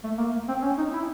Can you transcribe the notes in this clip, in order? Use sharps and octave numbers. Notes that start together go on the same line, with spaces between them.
A3
A#3
C4
C#4
D#4
E4